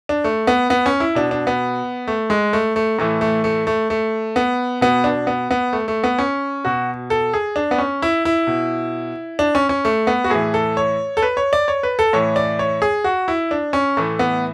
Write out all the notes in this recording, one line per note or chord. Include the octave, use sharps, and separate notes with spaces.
D4
A3
B3
B3
C#4
E4
B2 D4
D4
B3
A3
G#3
A3
A3
A2 E3 A3
A3
A3
A3
A3
B3
B2 B3
D4
B3
B3
A3
A3
B3
C#4
B2 F#4
A4
G#4
D4
B3
C#4
E4
E4
B2
D4
C#4
C#4
A3
B3
F#4
A2 E3 G#4
A4
C#5
A4
B4
C#5
D5
C#5
B4
A4
A2 E3 C#5
D5
C#5
G#4
F#4
E4
D4
C#4
A2 E3 A3
B3